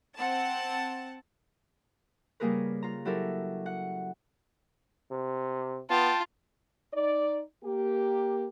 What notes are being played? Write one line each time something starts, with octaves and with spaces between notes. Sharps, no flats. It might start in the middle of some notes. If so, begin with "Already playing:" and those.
C4 F#5 A5
C#3 G3 A#3 G#4 A#4 B4
F4 A#5
F#3 E4 G4 A4 A#4
F#5
C3
B3 F4 G5 A5
D#4 D5
A#3 G4